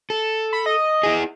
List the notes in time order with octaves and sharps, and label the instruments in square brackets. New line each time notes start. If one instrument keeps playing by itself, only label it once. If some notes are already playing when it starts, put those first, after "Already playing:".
[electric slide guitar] A4
[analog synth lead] B5
D#5
[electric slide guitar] E4 G#4